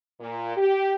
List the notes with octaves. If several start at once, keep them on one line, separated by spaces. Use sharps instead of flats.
A#2
G4